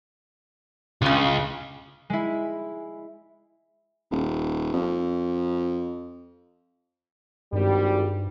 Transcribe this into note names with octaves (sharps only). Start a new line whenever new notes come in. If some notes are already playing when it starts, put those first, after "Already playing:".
C#2 C#3 G#3
G#3 E4
D#1
F2
G#1 G2 G3